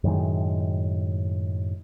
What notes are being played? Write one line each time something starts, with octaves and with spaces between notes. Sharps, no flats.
F#2 A2 D#3 G#3